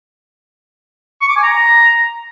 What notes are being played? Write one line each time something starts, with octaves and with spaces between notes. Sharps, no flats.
C#6
D6
G#5
A#5